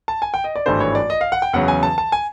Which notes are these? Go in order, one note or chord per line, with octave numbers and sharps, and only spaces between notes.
A5
G#5
G5
D#5
D5
G#1 G2 E3 A3 D4 C5
C#5
D5
D#5
F5
F#5
G5
E2 C#3 F#3 F#5
G#5
A5
A5
G#5